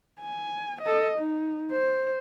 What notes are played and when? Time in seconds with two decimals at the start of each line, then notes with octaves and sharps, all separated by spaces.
0.21 G#5
0.82 A4 D#5
1.18 D#4
1.72 C5